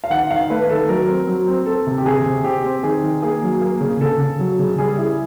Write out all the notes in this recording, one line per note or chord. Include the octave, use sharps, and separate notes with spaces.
F5
D#3 F#5
D#3 F5
A3 B4
D#3 A4
F#3 A#4
C4
F#3
C4
C4 A4
C3
G4
C3 G#4
C3
C4 G4
C4
D#3 G#4
D#3
A#3 G#4
F#3
A#3
C#3
C#3 A4
C#3
F#3
C#3
G3 G#4
E4 G#4